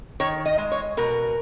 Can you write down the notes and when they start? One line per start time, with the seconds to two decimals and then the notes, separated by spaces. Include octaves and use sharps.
0.20 D#3 C#5
0.46 D#5
0.58 G#3
0.72 C#5
0.97 B2 A#4